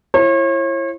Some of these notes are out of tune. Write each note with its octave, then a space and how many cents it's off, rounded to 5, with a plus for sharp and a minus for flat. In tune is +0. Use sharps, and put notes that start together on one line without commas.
E4 +30 C#5 -40